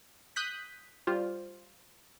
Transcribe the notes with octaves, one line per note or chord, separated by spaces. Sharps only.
D#6 F#6 G6 B6
G3 F4 C5